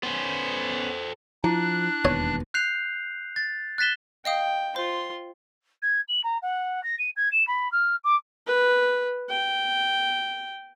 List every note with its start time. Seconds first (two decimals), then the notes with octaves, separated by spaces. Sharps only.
0.03 B3 C#4 A4 C5
1.44 F3 D4 E4 F#6
2.05 E1 D#2 B3 C#5
2.54 F#6 G6 C7 F7
3.36 A6
3.78 F#6 A6 B6 E7 G7
4.25 D#5 F5 G5 D#6
4.76 F4 C5 C6
5.82 G#6
6.08 F#7
6.24 A#5
6.42 F#5
6.84 A#6
6.99 D#7
7.16 G#6
7.32 E7
7.47 B5
7.72 F6
8.04 D6
8.47 B4
9.29 G5